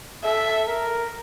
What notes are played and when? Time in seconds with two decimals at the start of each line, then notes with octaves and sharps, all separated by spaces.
0.24 A4 E5
0.67 A#4